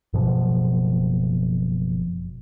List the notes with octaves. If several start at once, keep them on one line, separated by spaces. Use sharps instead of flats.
F#1 B2 F3